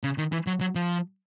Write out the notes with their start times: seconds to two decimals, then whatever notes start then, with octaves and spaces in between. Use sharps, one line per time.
0.04 C#3
0.18 D#3
0.32 E3
0.47 F#3
0.61 F#3
0.75 F3